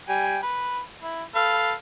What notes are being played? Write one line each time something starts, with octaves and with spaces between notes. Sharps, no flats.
G3 G5 G#5
B4
E4
A4 B4 F5